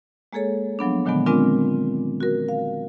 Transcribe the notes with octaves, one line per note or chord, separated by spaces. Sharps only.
G#3 A#3 G#4 A4 C#5
F3 F#3 B3 D4
A#2 D3 D#3 F#3 G#3 B3
G#3 B3 C4 D4 F4 A#4
F#4 A#4
F5